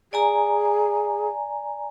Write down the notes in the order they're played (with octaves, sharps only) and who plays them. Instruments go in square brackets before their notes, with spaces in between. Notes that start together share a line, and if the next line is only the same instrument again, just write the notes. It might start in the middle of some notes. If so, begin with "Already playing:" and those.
[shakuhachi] G#4 [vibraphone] D5 G#5 A#5